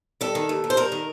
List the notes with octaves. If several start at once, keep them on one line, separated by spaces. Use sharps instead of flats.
G3 A4
D#3
D#2
D#2
C5
G3 A#4
D#3